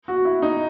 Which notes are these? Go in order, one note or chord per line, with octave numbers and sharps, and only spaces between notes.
F#4
E4
D#4